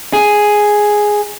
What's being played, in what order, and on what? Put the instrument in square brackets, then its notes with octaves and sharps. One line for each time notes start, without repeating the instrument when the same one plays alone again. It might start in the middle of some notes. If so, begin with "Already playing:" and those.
[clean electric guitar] G#4